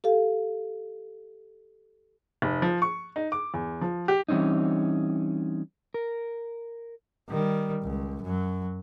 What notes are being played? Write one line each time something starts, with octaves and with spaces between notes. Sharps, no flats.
G4 A4 F5
F1
F3
C#6
D#4
D6
E2
F3
G4
E3 G3 C4 C#4 D#4
A#4
D#3 G3
C#2
F#2 F#3